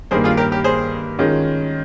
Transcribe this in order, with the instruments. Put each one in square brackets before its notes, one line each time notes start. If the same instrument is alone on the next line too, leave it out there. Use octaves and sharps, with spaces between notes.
[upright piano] G2 D#3 A#3 [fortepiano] G#4 C5
[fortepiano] F4 G#4
G4 A#4
G4 A#4
G#4 C5
[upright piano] D#3 G#3 C#4 F4